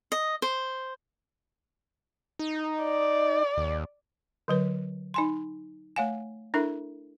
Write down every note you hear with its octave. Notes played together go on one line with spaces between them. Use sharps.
D#5
C5
D#4
D5
D#2
D3 F#3 B4 C#5
D#4 G#5 C6
A3 C#5 F5 F#5 G#5
D4 E4 A4 A#4 E5 B5